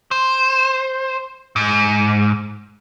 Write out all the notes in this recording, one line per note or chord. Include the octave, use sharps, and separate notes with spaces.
C5
G#2